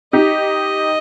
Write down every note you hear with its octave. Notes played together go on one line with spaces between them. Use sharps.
D#4 G4 D#5